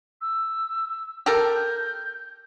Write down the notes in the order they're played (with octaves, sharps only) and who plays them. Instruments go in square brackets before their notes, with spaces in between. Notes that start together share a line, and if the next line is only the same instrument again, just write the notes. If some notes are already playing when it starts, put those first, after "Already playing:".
[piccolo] E6
[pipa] G4 A4 A#4 [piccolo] G6